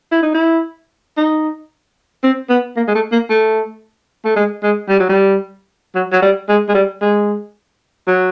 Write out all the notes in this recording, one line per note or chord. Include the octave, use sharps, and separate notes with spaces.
E4
D#4
E4
D#4
C4
B3
A#3
G#3
A3
A#3
A3
A3
G#3
G#3
G3
F#3
G3
F#3
F#3
G3
G#3
G#3
G3
G#3
F#3